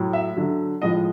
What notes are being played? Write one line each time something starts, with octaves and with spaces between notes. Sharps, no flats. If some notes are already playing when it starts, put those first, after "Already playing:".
Already playing: A2 F#3
E5
D3 F#3
A2 F3 G#3 D#5